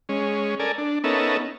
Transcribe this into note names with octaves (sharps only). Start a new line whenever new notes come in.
G#3 C#4
A4 A#4 D5 G#5
D4
B3 C#4 D#4 A4 A#4 E5